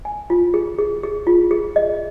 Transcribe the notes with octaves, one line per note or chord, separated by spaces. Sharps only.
G#5
F4
G#4
G#4
G#4
F4
G#4
D#5